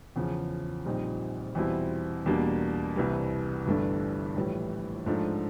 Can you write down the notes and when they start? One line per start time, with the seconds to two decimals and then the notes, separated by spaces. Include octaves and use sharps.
0.16 E2 C#3 F3
0.85 A#1 A#2 G3 C4 D#4
1.55 E2 B2 G3 C4 E4
2.26 E2 B2 G3 A#3 D4
2.96 C2 C3 E3 G3
3.66 G1 G2 E3 A3 D4
4.36 A#1 A2 E3 G3
5.06 G#2 F3 A3 D4